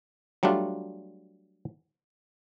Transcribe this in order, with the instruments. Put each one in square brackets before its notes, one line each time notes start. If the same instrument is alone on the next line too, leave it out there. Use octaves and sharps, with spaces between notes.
[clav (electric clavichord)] F#3 G3 A3 D4 F4